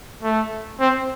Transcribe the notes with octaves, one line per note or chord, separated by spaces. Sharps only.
A3
C4